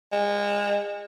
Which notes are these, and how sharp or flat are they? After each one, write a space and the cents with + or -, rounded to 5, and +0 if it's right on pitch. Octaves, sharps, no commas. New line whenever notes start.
G#3 -30